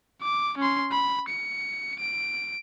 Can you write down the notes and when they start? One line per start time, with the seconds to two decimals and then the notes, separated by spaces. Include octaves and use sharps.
0.22 D6
0.58 C#4 C6
0.91 B5
1.28 C#7
1.99 D7